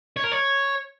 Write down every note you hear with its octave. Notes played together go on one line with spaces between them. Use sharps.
C#5
A#4
C#5